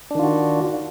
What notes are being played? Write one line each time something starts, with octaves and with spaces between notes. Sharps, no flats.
D#3 D4 F4 F#4